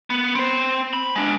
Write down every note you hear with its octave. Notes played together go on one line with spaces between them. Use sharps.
B3
C4 C5
B5
G#3 D4